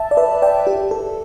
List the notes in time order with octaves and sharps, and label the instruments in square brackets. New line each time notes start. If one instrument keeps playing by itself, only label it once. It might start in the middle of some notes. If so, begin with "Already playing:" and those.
Already playing: [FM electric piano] E5 A5
D5
B4 E5
D5 G5
G4
A4